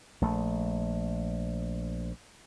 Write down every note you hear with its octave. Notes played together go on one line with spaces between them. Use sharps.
A#1 A3